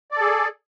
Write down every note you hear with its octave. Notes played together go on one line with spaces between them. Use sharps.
G#4 A4 D5